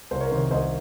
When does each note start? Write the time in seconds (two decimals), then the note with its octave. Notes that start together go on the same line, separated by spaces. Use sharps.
0.11 C2 C5
0.21 A#4 C#5
0.31 C3 D#3 C5
0.51 C2 C5 D#5